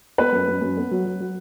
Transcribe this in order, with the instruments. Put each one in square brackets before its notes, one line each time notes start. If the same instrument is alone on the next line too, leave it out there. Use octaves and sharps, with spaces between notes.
[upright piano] B3 B4
F#2
F#2
F#2
B3
F#3
F#3
F#3